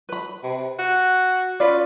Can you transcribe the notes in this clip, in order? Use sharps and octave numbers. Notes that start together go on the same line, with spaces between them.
B4 B5
C3
F#4
C#4 F4 B4 D5